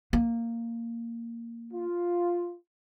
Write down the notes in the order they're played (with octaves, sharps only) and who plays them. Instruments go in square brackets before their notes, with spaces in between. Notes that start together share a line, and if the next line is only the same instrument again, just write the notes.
[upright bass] A#3
[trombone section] F4